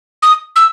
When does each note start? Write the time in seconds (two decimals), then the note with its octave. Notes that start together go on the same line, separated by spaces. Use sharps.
0.23 D#6
0.56 E6